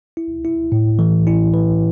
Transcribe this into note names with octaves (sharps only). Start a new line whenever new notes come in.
E4
E4
A2
E3
E4
B4